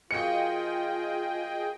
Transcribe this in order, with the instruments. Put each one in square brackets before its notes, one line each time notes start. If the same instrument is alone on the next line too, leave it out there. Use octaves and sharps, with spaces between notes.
[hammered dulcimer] F3 A#3 F#4 [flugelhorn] F4 [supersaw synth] G#4 D#5 G5 [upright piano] C#7